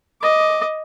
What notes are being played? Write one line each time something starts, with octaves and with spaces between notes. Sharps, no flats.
D#5 D6